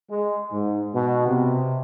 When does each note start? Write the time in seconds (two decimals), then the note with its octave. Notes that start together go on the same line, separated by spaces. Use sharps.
0.10 G#3
0.52 G#2
0.95 B2
1.26 C3